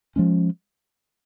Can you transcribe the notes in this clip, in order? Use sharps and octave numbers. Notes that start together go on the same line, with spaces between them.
F3 G#3 C#4